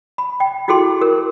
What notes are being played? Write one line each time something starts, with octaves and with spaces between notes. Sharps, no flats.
B5
G5
E4 F#4 G#4 A4 C6
A#4